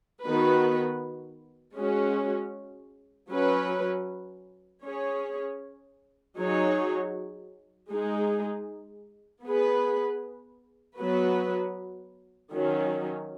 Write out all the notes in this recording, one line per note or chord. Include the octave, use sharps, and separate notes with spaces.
D#3 B3 F#4 B4
G#3 C#4 F#4
F#3 C#4 B4
C#4 G#4 C#5
F#3 D#4 G#4 C#5
G#3 D#4 G#4
B3 G#4 B4
F#3 B3 F#4 B4
D#3 F#3 C#4